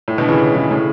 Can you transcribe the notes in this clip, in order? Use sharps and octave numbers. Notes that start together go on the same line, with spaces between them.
A2
B2 D3
C#3 E3
C#3 E3
A2 C#3